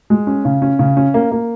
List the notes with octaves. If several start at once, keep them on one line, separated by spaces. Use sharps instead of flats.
G#3
C#4
C#3
C#4
C#3
C#4
A#3
A#3